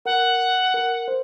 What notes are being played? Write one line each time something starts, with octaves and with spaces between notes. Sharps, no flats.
A#4 F#5
A#4
C5